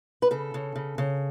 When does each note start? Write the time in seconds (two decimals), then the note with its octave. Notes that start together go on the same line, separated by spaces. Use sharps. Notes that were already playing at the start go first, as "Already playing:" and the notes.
0.22 B4
0.31 C#3 A4
0.54 C#3
0.76 C#3
0.98 C#3